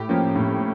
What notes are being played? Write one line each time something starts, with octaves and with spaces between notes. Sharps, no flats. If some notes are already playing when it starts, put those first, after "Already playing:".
Already playing: A2 G4
F3 A#3 C#4
A2